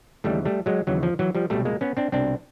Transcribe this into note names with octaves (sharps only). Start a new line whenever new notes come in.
D#2 C#3 E3 G3 A3
G3 A3
F#3 G#3
D#2 C#3 E3 F#3
F3
E3 F#3
F3 G3
C2 B2 G3 A3
G#3 A#3
B3 C#4
C4 D4
C2 B2 C4 D4